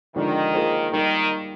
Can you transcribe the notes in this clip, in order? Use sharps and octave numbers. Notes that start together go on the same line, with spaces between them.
D3 D#3 F3 G#3 D4 G4
A#3 F4 G#4 C5
D#3 G3 A#3 D#4